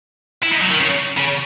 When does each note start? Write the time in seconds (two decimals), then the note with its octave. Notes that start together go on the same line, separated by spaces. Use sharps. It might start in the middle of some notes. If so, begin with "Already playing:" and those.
0.43 E4
0.52 D#4
0.62 F#3
0.71 D#3
0.80 C#3
1.18 C#3